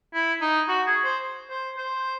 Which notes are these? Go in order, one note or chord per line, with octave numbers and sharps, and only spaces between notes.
E4
D#4
F#4
G#4
C5
C5
C5